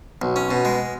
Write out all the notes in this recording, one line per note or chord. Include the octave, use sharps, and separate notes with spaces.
B1
C#4
B2
G#3